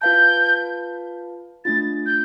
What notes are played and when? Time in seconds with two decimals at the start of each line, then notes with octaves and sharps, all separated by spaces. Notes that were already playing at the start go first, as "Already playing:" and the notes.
0.02 F4 B4 F5 A5 G6
1.65 A3 D4 F4 A6
2.06 G6